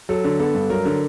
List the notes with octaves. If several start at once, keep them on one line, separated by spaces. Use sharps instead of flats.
F#3 A4
D3
B3 A4
G2
F#3 A#4
D3